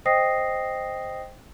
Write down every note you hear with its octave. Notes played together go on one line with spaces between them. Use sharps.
C5 D#5 G5 D#6 A#6 C7